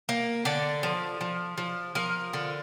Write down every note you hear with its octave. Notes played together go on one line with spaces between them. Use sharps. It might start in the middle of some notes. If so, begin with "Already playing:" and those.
A#3
D3 D5
F3
F3
F3
F3 A#4
D3